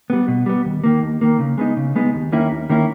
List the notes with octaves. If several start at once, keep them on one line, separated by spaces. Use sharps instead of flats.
G3 B3
B2
G3 B3
D#2
D#3 A#3
D#2
D#3 A#3
C#3
G#3 B3 D#4
C#3
G#3 B3 D#4
D#2
D#3 A#3 C#4 E4
D#2
D#3 A#3 C#4 E4